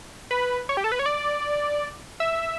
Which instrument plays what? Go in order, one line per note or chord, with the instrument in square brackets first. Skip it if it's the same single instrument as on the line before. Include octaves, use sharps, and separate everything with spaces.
[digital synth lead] B4
C#5
G4
A4
B4
C#5
D5
E5